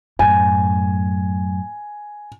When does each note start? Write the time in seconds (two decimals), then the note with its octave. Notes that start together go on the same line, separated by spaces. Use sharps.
0.19 F#2 A2 G#5